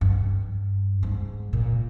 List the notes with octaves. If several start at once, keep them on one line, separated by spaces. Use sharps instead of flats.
G2
G#2
A#2